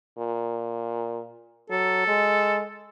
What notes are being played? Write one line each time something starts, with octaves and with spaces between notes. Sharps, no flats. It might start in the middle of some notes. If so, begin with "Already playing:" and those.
A#2
F#3 A4
G#3